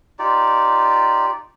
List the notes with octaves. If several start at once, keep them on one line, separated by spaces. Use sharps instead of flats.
D#4 F4 G4 D5